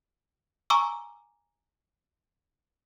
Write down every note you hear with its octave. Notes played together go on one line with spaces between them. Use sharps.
G#5 A#5 C#6 D6 E6